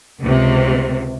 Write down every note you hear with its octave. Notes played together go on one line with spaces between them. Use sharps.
C#2 C3